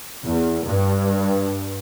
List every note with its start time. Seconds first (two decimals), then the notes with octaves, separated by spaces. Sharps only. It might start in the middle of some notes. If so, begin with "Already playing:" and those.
0.25 E2
0.65 G2